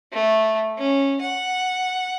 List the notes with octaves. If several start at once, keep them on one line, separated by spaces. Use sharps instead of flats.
A3
C#4
F#5